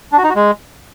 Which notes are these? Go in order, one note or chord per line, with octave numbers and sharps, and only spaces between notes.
D4
F#4
D#4
F#4
G#3